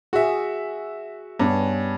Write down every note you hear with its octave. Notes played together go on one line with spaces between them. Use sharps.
F#4 G#4 E5
G2 B3 C#4 C#5